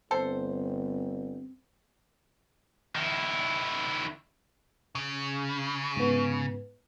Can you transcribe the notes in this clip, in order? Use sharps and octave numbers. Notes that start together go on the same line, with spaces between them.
G1 C4 A4 C5
D#3 E4
C#3
G#2 B3